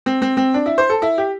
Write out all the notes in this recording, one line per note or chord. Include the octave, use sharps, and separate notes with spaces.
C4
C4
C4
D4
E4
C5
A4
E4
G4